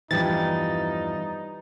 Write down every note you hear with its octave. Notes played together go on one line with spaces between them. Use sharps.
E2 G2 E3 F3 G3 D4 D#4 A6